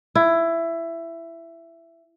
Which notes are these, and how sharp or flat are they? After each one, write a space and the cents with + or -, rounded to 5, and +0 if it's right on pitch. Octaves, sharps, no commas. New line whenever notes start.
E4 +15